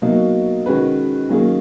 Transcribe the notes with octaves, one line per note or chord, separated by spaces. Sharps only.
B2 F#3 A#3 D#4
D#3 G#3 C#4 F#4 B4
D#3 F#3 A#3 C#4 G#4